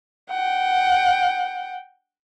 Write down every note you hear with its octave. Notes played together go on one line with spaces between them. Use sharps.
F#5 G5